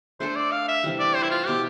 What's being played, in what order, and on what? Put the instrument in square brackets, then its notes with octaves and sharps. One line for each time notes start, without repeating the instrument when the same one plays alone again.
[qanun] A3 D4 A4 [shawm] C5
[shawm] D5
F5
E5
[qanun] C3 E3 G3
[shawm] D5
C5
E4
F4
[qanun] B2 B3 E4 [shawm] G4